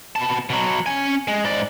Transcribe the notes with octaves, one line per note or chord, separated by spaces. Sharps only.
B2 A5
B2 F#3
C#4 G#5
G#3
G#2 D5